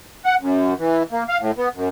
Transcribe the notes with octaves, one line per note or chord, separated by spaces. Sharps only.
F#5
F#2
E3
A#3
F5
A2
B3
F#2